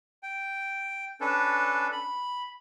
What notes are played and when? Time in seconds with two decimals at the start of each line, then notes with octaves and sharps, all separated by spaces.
0.23 G5
1.21 C#4 D4 A4 B4
1.92 B5